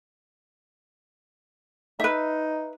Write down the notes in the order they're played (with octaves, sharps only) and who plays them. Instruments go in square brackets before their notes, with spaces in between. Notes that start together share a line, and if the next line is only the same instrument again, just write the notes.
[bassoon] D#4 [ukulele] B4 E5